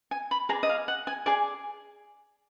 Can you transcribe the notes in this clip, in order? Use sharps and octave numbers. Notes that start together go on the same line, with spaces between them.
G#5
B5
G#4 D5 A#5
D#5
F5
F#5
G#5
G#4 D5 G#5